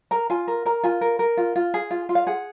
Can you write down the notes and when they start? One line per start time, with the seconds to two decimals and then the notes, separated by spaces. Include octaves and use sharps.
0.11 A#4 A#5
0.30 F4 G#5
0.48 A#4
0.65 A#4 A#5
0.83 F4 G#5
1.01 A#4
1.19 A#4
1.37 F4
1.56 F4
1.74 G#4
1.91 F4
2.09 F4
2.15 F5
2.27 G#4 F#5